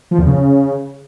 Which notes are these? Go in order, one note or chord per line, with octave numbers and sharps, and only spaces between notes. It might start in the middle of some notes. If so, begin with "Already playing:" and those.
F3
E2
C#3